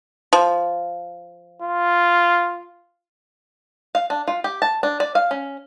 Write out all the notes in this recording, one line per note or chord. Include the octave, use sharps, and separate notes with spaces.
F3
F4
F5
D4
F4
G4
A5
D4
D5
F5
C#4